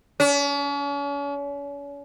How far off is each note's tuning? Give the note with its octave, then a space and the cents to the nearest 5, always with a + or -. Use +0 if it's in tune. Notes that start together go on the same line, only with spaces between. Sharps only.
C#4 +40